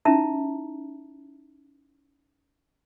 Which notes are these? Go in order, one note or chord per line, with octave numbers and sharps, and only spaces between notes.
C#4 D#4 E4 E5 A5 A#5